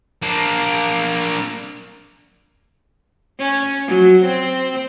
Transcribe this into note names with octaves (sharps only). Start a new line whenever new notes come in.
A#3 D4
C#4
F#3
C4